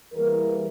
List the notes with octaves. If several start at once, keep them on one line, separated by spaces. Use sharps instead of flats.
E2 E3 G3 A#3 A#4